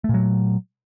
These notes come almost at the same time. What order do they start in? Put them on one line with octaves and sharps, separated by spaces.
A3 A#2 F#3